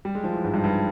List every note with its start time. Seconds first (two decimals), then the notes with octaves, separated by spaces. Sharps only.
0.05 G3
0.15 G#3
0.24 F3
0.34 E3
0.44 G#2
0.54 G2
0.64 G2